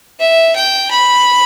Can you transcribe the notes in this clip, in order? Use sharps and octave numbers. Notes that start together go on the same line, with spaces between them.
E5
G5
B5